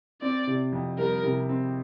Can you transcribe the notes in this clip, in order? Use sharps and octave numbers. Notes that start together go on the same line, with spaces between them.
C4 D5
C3
F2
G3 A#4
C3
C4